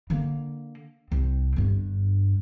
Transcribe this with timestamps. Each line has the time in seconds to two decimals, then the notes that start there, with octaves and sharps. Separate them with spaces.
0.10 D3 A#3
1.12 C2 C4
1.56 G1 G2